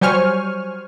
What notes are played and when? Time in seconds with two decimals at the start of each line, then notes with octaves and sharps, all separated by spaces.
0.01 F#3 G3 C5 G#5 C#6 F6